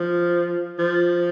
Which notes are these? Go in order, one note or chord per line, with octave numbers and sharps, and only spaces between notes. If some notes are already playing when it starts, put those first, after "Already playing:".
Already playing: F3
F3